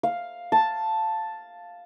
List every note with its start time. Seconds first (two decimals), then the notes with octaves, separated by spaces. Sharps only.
0.03 F5
0.52 A5